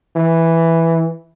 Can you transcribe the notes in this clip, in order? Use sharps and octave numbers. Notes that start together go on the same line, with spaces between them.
E3